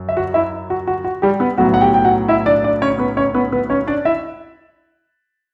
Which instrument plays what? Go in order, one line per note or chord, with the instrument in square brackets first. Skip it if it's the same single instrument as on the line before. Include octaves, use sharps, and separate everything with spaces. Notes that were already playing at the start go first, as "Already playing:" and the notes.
Already playing: [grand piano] F#2
E5
F#4 F#5
E4 E5
F#4
F#4
F#4
G3 G4
B3 B4
B1 A2 F#3 B3 F#4 F#5
F#5
G4 G5
G5
F#4 F#5
E4 E5
D4 D5
D4 D5
C#4 C#5
B3 B4
C#4 C#5
B3 B4
B3 B4
C#4 C#5
D4 D5
E4 E5